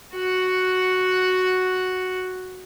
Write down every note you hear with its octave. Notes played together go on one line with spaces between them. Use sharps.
F#4 F#5